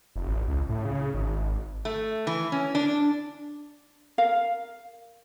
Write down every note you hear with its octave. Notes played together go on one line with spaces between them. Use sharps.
F1
A1
C#2
A2
C#3
G#1
A3
E3
C#4
D4
A#4 F5